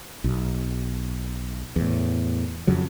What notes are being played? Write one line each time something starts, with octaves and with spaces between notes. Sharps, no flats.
B1
E2 A2
F2 C#3 F#3